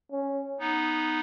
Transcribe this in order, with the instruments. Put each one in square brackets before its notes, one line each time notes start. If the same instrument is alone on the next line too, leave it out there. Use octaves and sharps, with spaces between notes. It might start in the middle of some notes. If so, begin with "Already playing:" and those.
[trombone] C#4
[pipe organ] B3 D#4